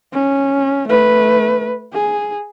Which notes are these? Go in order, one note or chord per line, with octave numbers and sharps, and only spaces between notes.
C#4
A3 B4
G#4